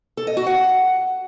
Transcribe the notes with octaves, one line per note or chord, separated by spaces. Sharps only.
A4
D#5
F#4
F#5